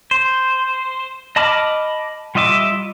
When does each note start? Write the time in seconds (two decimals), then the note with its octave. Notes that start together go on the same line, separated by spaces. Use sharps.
0.11 C5
1.36 D#5 A5 B5 D6 F6
2.35 G3 F4 D#5 E5 D6